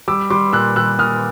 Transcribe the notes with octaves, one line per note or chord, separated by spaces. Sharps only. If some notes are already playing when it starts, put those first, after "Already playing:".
G3 D6 E6
G3 C6 D6
A#2 E6 F#6
G3 E6 F#6
A#2 D#6 F6